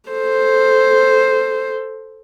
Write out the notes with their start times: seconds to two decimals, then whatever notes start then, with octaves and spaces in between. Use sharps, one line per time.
0.10 A4 C5